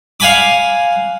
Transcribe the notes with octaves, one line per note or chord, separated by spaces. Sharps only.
F5 F#5 G#5 B5 D6